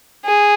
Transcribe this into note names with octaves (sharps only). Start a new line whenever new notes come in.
G#4